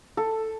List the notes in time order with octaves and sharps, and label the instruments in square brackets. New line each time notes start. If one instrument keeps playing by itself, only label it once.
[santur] A4